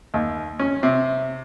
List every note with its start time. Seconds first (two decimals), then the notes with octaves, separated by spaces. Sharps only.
0.14 D#2
0.59 C#4
0.83 C3